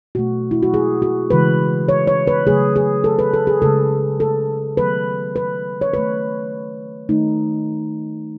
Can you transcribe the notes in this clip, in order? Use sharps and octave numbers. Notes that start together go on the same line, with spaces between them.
B2 A3 F#4
E4
F#4
G#4
F#4
C#3 E3 G#3 B4
C#5
C#5
B4
C#3 F#3 A3 G#4
G#4
A4
B4
A4
G#4
C#3 G#3 A4
A4
D#3 F#3 A3 B4
B4
C#5
D#3 A3 B4
D#3 A3 D#4